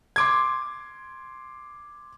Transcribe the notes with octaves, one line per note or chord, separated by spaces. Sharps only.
C6 D6 G#6